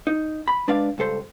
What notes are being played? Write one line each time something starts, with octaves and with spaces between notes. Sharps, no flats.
D#4
B5
G#3 D4 B4 D5 F5
C#2 G2 A4 C5